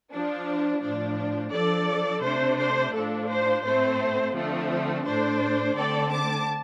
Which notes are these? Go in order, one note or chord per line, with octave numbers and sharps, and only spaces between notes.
F3 D4
A2 F3 D4
F3 D4 A4 D5
C3 A3 D4 C5
C5
A2 F3 D4 A4
C5
A2 A3 C4 C5
D3 F3 A3 C4
A2 A3 D4 C5
D3 A3 C4 A4 D5
A5 D6